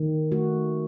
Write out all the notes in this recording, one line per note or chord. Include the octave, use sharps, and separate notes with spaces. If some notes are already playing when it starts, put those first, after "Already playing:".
Already playing: D#3
A3 F#4